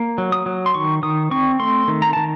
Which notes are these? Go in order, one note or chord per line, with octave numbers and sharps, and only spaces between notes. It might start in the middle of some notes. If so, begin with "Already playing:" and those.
Already playing: A#3
F#3
D#6
F#3
C6
D#3 C#6
D#3 D#6
C4 C#6
A3 C6
D#3
A#5
D#3 A5